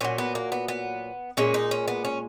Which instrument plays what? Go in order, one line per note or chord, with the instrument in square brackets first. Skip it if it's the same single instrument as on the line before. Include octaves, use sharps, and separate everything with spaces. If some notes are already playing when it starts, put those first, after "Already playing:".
[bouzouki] A#2 F#3 C#4
B3
A#3
B3
B3
A#2 G#3 C#4
D#4
C#4
B3
C#4